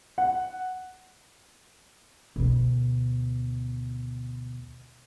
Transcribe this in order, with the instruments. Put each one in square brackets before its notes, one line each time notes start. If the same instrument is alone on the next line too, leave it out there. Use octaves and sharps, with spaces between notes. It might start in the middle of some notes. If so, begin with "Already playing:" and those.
[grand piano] F#5
[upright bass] D2 B2